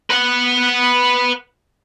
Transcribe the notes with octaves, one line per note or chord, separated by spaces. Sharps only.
B4 F#5